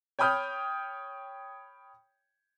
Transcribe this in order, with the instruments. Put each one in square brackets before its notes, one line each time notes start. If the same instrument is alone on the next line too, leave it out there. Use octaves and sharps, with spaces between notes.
[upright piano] C#5 G5 B5 D#6 F6 G6